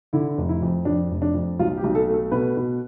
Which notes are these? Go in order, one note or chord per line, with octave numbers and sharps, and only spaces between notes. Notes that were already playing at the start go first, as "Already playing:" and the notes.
D3 E4
F1
E4
F2
F2 D4
F1
D4
F2
B1 F4
G4
B1
A4
A3
A4
B2 B4
B2